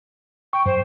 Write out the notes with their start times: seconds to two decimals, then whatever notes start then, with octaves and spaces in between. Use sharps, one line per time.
0.53 G5 C#6
0.66 F#2 C5